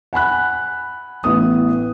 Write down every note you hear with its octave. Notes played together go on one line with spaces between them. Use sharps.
F#5 G#5 B5 F#6
A1 B3 D#6